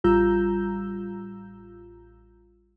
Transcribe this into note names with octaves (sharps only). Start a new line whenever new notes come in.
A1 G3 F4 A#5 E6 G6